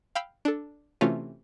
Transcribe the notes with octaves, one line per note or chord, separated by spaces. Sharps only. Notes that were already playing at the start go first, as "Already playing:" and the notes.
F5 G5 B5 E6
D4 A4
C3 E3 A3 C#4 F4 F#4